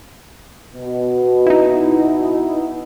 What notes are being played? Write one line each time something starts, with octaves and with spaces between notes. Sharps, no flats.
B2
D#4 E4